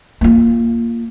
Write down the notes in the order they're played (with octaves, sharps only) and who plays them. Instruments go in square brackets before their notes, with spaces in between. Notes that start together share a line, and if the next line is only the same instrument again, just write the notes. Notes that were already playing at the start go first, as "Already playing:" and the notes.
[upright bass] A#3 F4